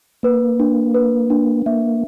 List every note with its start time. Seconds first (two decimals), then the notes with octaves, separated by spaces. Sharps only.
0.23 A#3 B4
0.60 D4
0.94 B4
1.30 D4
1.66 A#3 E5